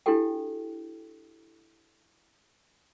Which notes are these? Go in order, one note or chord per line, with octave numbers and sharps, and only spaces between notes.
D4 E4 F#4 G4 A4 G5